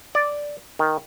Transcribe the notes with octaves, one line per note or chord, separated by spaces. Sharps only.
D5
D#3